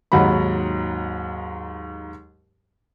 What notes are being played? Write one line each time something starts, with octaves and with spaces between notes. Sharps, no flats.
D#2 G#2 F#3 F#5 B5